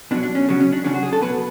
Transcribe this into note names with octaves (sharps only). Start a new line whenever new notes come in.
B2 F#3 D4
D4
C#4
C#3 F#3
C#4
D4
C#3 F#3 D4
F#4
G#4
A4
B2 F#3 B4